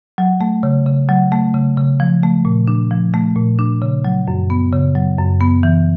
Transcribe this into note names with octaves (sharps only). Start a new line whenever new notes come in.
F#3
A3
C#3
C#3
F#3
A3
C#3
C#3
F3
A3
A#2
D4
F3
A3
A#2
D4
C#3
F#3
F#2
B3
C#3
F#3
F#2
B3
E3